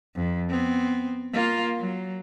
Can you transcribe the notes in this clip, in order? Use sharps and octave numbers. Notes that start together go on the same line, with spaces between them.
F2
B3 C4
A#3 F4
F#3